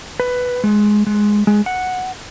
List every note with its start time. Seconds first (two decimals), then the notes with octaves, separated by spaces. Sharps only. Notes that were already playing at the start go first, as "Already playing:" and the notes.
0.20 B4
0.64 G#3
1.07 G#3
1.47 G#3
1.66 F#5